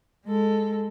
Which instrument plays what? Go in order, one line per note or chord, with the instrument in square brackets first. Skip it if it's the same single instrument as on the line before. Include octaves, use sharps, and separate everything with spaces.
[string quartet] G#3 A4